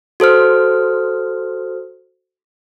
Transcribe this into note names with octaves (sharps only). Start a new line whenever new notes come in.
F#4 A4 C5 F6